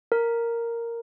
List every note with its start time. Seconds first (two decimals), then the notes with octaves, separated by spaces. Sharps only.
0.12 A#4